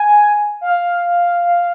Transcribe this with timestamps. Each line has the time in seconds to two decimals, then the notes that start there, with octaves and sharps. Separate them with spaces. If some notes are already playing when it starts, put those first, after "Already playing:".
Already playing: G#5
0.61 F5